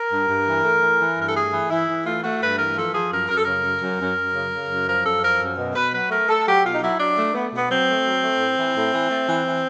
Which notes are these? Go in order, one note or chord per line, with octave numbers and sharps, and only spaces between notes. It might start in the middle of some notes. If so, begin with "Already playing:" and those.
Already playing: A#4
G2
G2
E3
A3
E3
E3
G2 A#4
A4
A3 G#4
E3
E3 E4
E3
A3 F4
A3 F#4
G2 B4
E3 A#4
F3 A4
F3 G#4
F#2 A#4
F#2 A#4
A4
C#3 A#4
F#2
F#2
F#2
F#2
C#3
C#3
F#2
F3 A#4
F#2 A4
F3 A#4
F#2
B2
B2 B4
F#3 B4
A3 A#4
A3 A4
F#3 G4
B2 F4
D#4
F#3 E4
F#3 D4
A3
A3 B3
B2 B3
F#3 C4
A3
F#3
A3
A2
E3
A2
E3
A3
E3
E3